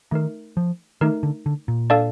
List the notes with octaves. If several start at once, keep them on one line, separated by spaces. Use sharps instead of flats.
D#3 A3 D#4 A#4
F3
D#3 A3 D#4 A#4
D3
D3
A#2
D4 A4 D5 F5 A5